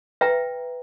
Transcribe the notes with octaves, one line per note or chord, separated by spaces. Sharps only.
B4 E5 G5 A#5